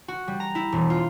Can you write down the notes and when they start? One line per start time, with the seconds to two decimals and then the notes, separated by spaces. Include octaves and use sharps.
0.08 F#4
0.28 G3
0.40 A#5
0.55 E4
0.72 E1
0.90 F4